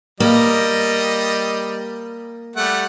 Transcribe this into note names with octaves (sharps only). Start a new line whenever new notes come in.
G3 A#3 D#5
G3 A3 F#5